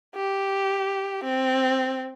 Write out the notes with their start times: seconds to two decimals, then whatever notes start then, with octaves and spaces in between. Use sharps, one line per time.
0.15 G4
1.24 C4